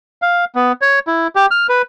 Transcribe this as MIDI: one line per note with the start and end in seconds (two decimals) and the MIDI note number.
0.22 0.45 77
0.55 0.72 59
0.81 0.99 73
1.07 1.27 64
1.36 1.46 67
1.51 1.67 89
1.69 1.82 71